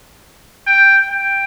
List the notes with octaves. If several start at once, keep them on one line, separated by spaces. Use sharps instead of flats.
G5
G5